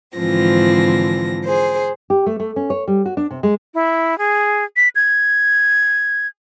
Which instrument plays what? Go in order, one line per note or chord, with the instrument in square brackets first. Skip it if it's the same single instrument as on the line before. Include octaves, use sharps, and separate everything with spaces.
[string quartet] G#2 D3 E3 F3 C4 A#6
G#4 C5
[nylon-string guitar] G4
A3
A3
C#4
C#5
G3
F#4
D4
C3
G#3
[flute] E4
G#4
B6
G#6